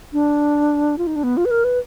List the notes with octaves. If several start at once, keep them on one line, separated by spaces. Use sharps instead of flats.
D4
F4
D#4
D4
B3
F4
B4
A#4
B4